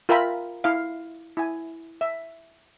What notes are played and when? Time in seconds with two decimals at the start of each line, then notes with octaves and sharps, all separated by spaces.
0.09 F4 A#4 E5 G5 A#5 B5
0.64 E4 F5
1.37 E4 G#5
2.01 E5